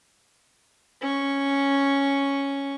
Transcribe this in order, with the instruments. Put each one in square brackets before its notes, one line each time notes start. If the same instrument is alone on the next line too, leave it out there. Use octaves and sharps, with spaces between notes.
[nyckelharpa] C#4 C#6